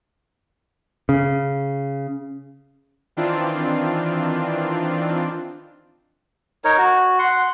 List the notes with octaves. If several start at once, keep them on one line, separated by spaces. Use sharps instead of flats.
C#3
D#3 E3 C4 D4 F4
D#4 A#4 C#5
F#4
F#5 C6